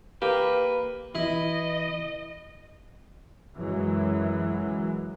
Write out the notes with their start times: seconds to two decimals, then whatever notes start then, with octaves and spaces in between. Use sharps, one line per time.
0.22 A#3 G4 B4
1.15 E3 E4 D#5
3.56 F#2 E3 F#3 G#3